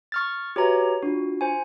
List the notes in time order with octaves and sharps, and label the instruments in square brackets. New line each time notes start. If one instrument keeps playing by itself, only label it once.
[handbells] C#6 F6 A6
[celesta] F#4 B4 E5 [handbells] G4 C#5 A#5
[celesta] D4 F4 [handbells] F#4
[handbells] C5 G#5